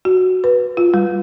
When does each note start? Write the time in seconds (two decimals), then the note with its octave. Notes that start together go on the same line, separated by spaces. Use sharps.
0.05 F#4
0.44 B4
0.77 F4
0.94 G3